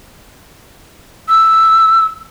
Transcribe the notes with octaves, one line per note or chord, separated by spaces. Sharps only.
E6